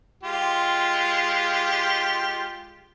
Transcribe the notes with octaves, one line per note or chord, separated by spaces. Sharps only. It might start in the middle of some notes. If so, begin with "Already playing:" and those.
G#3 F4 G4